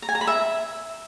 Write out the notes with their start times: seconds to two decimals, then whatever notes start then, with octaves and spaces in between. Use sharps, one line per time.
0.02 A#5
0.09 G#5
0.15 A#5
0.21 B5
0.27 E5